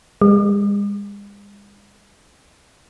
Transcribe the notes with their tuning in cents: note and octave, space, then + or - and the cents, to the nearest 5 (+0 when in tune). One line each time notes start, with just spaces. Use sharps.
G#3 -45